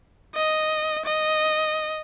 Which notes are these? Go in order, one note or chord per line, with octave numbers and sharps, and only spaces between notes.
D#5
D#5